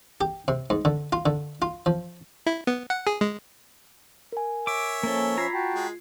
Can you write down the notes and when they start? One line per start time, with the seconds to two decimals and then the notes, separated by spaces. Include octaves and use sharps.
0.21 G4
0.48 C3
0.70 G#2
0.85 D3
1.12 F4
1.26 D3
1.62 F4
1.86 F3
2.47 E4
2.67 B3
2.90 F#5
3.07 G#4
3.21 G#3
4.32 A#4 G#5
4.67 C#5 E5 D6
5.03 F3 A#3 C#4 A4
5.38 F4 A#5 B5 G#6 C7
5.54 F#4 G5 A5
5.75 G#3